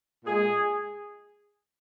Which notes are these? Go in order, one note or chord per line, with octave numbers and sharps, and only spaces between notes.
A#2 G#3 G#4